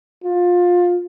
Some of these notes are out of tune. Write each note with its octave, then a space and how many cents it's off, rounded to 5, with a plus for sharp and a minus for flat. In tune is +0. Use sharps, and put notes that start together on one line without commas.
F4 +20